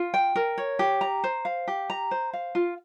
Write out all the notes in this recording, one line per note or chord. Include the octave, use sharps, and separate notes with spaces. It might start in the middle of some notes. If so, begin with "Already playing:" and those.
Already playing: F4
G5
A#4
C#5
G4
A#5
C5
F5
G4
A#5
C5
F5
F4